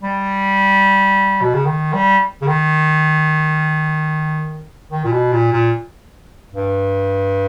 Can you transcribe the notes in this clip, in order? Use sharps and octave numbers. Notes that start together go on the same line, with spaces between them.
G3
B2
C#3
D#3
G3
C#3
D#3
D#3
A#2
B2
A#2
A#2
G2